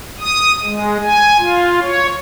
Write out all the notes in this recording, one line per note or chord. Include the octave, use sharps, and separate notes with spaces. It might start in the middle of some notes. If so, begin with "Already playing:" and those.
D#6
G#3
G#5
F4
C#5